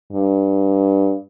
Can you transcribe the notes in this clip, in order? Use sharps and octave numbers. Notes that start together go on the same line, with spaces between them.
G2